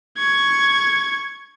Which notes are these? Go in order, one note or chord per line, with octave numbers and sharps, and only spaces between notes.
C#6 G#6